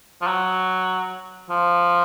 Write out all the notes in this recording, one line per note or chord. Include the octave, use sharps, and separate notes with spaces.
F3
F#3
F3